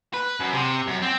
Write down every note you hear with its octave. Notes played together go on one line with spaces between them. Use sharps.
B4
F#2
C3
F#2
C4